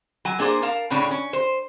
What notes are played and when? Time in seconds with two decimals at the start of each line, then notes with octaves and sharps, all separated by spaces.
0.25 F#3 G#5
0.39 A#3 D4 G#4 C5
0.62 A#4 F5 A5
0.90 A2 C#3 C#4 D4
1.11 C#4
1.33 C5